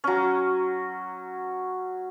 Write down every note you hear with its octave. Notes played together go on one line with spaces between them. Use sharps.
F#3 C#4